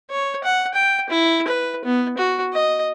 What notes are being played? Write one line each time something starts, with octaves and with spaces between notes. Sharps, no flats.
C#5
F#5
G5
E4
B4
B3
F#4
D#5